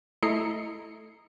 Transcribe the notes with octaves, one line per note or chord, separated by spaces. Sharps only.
A3 E4 D#5 A#5 C7 C#7